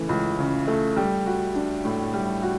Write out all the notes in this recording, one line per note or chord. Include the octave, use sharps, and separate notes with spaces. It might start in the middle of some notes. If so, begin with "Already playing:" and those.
Already playing: C#3 E3 A3
C#2
C#3
A3
G3
F#4
D4
A2
G3
F#4